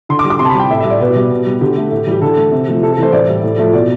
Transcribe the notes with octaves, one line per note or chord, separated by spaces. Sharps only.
D3 C6
D6
G3
D6
C3 C6
A5
B5
G3 G5
A2 E5
E5
G3
D5
B2 B4
G3
B2
G3
D3 G4
A3
A2
E3 G3 G4
D3 A4
A3
C3
F3 A3
C3 A4
A4
E3 A3 C5
A2 D5
G3
A2
F3 A3
B2 D5